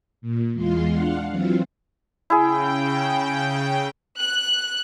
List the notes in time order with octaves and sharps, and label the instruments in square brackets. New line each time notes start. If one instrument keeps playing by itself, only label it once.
[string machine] A#2
E2 G#3 F4 C6
D4 F5 F#5
E3 F#3 C4 F4
[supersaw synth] C#3 G5 [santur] E4 G#4
[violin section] F#6